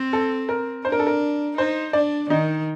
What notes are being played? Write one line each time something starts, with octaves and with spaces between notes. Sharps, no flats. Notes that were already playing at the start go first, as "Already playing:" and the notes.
Already playing: C4
A4
A#4
D4 C5
A#4
A4
A#4
D#4 C5
D4 D5
D#3 D#4